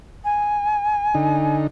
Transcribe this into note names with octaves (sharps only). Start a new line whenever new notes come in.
G#5
D3 D#4